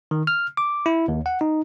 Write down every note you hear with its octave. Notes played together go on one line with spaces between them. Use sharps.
D#3
F6
D6
E4
D#2
F#5
D#4